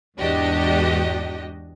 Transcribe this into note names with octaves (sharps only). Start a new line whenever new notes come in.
E2 G#2 D4 F#4 G4 D#5